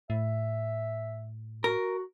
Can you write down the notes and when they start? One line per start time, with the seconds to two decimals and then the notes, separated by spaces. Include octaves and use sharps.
0.10 A2 E5
1.64 F#4 A#4